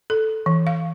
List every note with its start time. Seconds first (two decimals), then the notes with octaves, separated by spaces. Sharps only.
0.10 A4
0.46 E3
0.67 F5